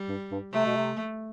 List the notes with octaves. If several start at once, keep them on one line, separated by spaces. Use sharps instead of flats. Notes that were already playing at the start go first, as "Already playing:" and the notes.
Already playing: G3
G2
G2
C3 A3
B2
C3